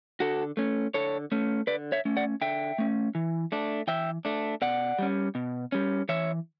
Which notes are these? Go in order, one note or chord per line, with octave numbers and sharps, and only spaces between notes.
D3 F#4 A4
A3 C#4
D3 A4 C#5
A3 C#4
D3 B4 D5
C#5 E5
A3 C#4
D5 F#5
D3 E5 G5
A3 C#4
E3
A3 D4
E3 E5 G5
A3 D4
B2 D5 F#5
G3 C#4
B2
G3 C#4
E3 C#5 E5